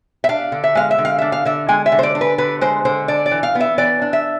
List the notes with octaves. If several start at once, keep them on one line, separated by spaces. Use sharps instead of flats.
E5
D4 F5
D3
E5
G#3 F5
E5
D3
F5
D4 E5
F5
D3 E5
G#3 G#5
E5
D3
C5
D5
D4
B4
D3 B4
G#3 C5
D3 C5
D4 D5
D5
E3
F5
B3
E5
E3 D5
D4
E5